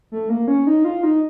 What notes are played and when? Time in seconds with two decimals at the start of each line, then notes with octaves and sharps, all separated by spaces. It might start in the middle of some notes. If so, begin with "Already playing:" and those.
0.12 A3
0.29 A#3
0.48 C#4
0.67 D#4
0.85 F4
1.03 D#4